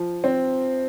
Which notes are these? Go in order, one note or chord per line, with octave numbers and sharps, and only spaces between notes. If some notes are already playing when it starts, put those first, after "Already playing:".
Already playing: F3
C4